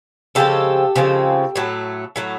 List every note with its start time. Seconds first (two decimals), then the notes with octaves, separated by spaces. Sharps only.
0.35 C#3 F3 G#3 C4 G4 A4
0.96 C#3 F3 G#3 C4
1.56 A2 F#3 A3
2.16 A2 F#3 A3